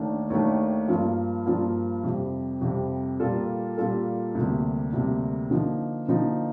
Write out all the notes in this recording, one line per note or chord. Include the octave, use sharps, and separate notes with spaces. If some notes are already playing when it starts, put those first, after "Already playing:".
Already playing: D#2 D#3 A3 D4
D#2 D#3 A3 D4
G2 F3 A#3 F4
G2 F3 A#3 F4
F2 C3 G3
F2 C3 G3
A#2 G3 A#3 F4 A4
A#2 G3 A#3 F4 A4
D2 C3 G3 A#3
D2 C3 G3 A#3
D3 F3 A#3 D#4
D3 F3 A#3 D#4